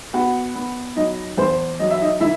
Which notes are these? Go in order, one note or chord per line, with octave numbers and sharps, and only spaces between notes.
B3 F#4 F#5
B3
F#3 D#4 D#5
E2 C5
F#3 D#5
E5
D#4 D#5
D#3 E4 E5